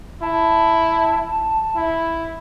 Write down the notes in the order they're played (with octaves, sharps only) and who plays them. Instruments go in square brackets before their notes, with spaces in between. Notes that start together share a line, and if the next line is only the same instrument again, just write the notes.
[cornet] E4 [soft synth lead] A5
[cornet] E4